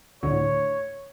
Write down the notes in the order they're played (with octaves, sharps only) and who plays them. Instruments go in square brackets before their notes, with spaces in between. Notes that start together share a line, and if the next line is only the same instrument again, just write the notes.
[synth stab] D2 A2 D3 [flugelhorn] C#5